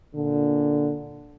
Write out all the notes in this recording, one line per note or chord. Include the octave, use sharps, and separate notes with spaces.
A#2 D3